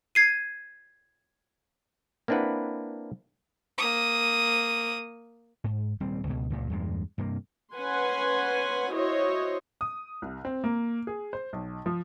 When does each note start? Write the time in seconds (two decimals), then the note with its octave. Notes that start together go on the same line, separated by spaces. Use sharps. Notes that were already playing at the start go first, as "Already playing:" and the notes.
0.15 G#6 C7 D#7
2.28 A#3 C4 D4 E4 B4 F#5
3.78 A#3 D#6
5.64 G#2
6.00 D#1 G3 C4
6.27 C#2 B2
6.50 C#2 G2 A#2
6.70 E2 G2 A#2 G#3
7.18 G2 C3 A#3
7.74 C#4 B4 F#5 G#5 C6
8.93 E4 F#4 C5 C#5 D#5
9.81 D#6
10.22 C2
10.45 C4
10.64 A#3
11.07 G#4
11.33 C5
11.53 B1
11.86 F3